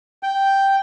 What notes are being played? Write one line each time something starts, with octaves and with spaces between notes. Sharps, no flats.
G5